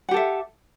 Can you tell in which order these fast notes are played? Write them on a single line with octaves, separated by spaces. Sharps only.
F#5 G4 A4 E5